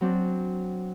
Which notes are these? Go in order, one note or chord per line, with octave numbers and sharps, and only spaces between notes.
F#3 C4 D4